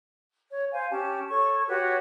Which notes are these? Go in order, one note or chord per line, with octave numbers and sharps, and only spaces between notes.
C#5
C5 F5 G#5
C#4 G4 A5
A4 C#5 C#6
F#4 G4 B4 C#5